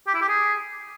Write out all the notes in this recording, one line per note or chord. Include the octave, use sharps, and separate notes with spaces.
G4
E4
G4
G#4